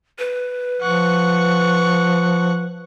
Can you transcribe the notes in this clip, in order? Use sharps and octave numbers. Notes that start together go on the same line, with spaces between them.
B4
F3 F#5 C#6